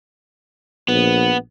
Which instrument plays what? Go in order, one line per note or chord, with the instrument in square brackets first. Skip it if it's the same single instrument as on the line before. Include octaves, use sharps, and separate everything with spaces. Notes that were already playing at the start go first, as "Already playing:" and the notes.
[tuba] A#1 [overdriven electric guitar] B3